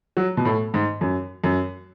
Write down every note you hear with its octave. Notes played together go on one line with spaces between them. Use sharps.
F#3
B2
A2
G#2
F#2
F#2